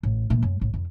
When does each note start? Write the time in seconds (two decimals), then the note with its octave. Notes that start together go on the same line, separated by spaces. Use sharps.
0.03 A1
0.30 A#2 E3
0.43 F#2
0.61 A1
0.74 F2